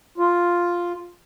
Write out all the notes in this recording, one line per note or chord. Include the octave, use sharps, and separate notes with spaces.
F4